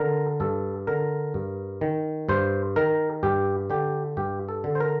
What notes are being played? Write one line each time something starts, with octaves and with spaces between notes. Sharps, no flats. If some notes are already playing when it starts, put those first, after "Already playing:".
Already playing: D3 A#4
G2 A4
D3 A#4
G2
D#3
G2 C5
D#3 A#4
G2 G4
D3 G4
G2 G4
A4
D3
C5
A#4